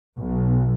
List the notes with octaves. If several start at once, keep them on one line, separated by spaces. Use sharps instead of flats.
B1